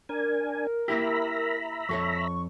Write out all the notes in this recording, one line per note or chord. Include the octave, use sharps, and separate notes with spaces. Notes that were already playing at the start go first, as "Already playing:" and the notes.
D4 A#4 G#5
A#3 E4 G4 E5 A#5 B5
F2 A4 C#5 C#6